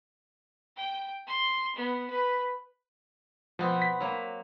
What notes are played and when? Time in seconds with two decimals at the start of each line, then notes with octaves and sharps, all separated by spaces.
0.77 G5
1.27 C6
1.76 B3
2.10 B4
3.59 B2 F3 B3 C4
3.82 B6
4.00 F#3 A#3